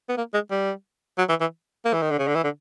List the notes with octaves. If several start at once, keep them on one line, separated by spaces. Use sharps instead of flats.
B3
A#3
G#3
G3
F#3
E3
E3
A#3
E3
D#3
D3
C#3
D3
E3
D3